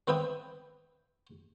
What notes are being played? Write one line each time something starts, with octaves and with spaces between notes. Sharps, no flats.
C4 B4 E5 G5 D#6